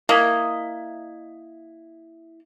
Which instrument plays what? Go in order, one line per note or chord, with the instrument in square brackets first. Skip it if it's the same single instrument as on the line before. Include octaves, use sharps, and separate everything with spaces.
[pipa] A#3 [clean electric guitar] E4 D#5